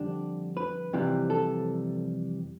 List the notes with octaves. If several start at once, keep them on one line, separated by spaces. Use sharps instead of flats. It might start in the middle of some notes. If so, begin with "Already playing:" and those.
Already playing: F2 D3 G3 D4
B4
F2 C3 E3 G3
A4